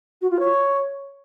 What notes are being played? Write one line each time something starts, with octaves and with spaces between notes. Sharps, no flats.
F#4
F4
C#5